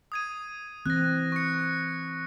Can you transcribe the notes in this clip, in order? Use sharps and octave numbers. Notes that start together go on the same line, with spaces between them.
D#6 G#6 D#7
E3 C4 F#6 A#6
C#6 C#7